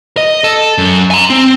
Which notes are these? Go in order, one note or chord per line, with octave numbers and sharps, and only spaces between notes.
D#5
A4
F#2
G#5 A#5
C4